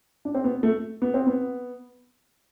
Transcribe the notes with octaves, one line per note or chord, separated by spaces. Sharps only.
D4
C4
B3
A3
B3
C4
B3